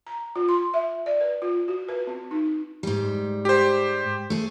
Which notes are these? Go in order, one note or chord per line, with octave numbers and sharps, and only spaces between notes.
A#5
F4
C6
E5
D5
B4
F4
F#4
B4
C4
D#4
G#2 G3
G4 C5
A3 G#4